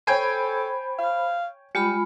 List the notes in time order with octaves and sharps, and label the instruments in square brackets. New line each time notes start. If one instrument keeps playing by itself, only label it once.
[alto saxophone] A4 [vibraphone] C5 B5 [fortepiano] C#5 G5 G#5
[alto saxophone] F5
[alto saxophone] G3 [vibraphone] G#3 F4 B5